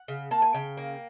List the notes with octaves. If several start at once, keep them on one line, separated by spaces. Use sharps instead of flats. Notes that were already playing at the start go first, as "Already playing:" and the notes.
Already playing: F#5
C#3
A#3 A5
G#5
C#3 G5
A#3